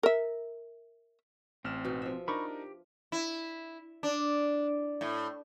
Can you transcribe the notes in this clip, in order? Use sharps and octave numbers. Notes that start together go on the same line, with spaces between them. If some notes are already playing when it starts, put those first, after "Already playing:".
A#4 E5
A1 C4 F6 E7
B2 D#4
F3 E5
D4 D#4 A#4 B5 C#6 D6
G4
E4
D4
A2